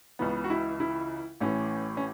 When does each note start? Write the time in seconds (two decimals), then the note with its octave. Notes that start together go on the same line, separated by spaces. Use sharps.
0.19 C#2 C#3 E3 B3
0.44 F#4
0.50 E4
0.80 E4
1.40 A1 A2 E3 C#4
1.97 C#4